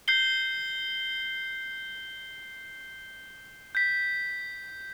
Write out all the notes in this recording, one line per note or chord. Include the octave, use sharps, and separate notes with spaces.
G6 C7 G7
G6 B6